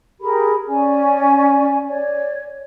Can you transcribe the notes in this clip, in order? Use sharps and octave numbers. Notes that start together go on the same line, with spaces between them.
G4 G#4 A#4 B5
C#4 D5 G#5
C#5 D5